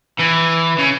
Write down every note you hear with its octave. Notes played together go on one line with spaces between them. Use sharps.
E3
C#3